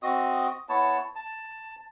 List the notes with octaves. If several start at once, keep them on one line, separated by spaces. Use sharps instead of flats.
C4 F#4 D#5 D#6
B3 E4 C#5 A5
A5